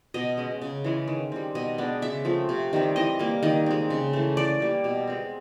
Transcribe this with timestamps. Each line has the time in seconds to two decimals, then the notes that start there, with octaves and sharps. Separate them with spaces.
0.14 B2 D#5
0.37 G#3 C#4
0.62 C#3
0.84 E3 G#3 C#4
1.08 D#3
1.32 G3 C4
1.55 B2 D#5
1.78 G#3 B3 D4
2.02 C#3 E5
2.25 F3 A3 C4
2.49 C3
2.73 D#3 G3 C4
2.96 E3 D#5
3.19 G3 A#3
3.43 D#3 D#5
3.66 G#3 C4
3.90 C#3
4.13 E3 A3
4.37 E3 D5
4.60 G3 A#3
4.84 B2
5.07 G#3 C4